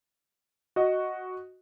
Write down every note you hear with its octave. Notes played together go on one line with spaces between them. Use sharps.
F#4 D#5